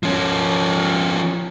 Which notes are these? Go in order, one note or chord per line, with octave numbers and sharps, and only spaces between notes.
F3 C#4